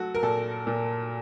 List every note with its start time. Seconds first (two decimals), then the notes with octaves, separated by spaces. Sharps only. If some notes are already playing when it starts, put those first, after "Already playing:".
Already playing: F#3 A3 F#4 A4
0.15 A#4
0.23 A#2 A4
0.67 A#2